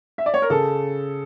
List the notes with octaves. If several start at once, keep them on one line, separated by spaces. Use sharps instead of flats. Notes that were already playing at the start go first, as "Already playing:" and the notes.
E5
D5
C#5
A#4
C#3 A4